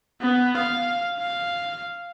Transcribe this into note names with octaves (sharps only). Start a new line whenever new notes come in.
B3
F5
F5